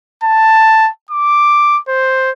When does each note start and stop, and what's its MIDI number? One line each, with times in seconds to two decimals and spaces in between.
0.24 0.90 81
1.11 1.79 86
1.89 2.31 72